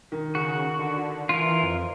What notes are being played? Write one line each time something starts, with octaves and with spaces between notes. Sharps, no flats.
D#3
C#3 F#4
D3
E3 F4 A#4
F2